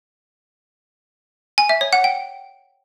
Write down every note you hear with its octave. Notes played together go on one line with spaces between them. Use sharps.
G#5
E5
C#5
F#5
G5